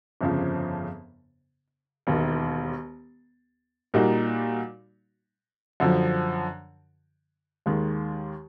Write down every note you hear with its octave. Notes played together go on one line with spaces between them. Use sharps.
G1 F2 C#3 F3
E1 D#2 D#3
A#2 G3 A#3 D#4 F#4
F#2 D3 F3
D#2 D#3 G#3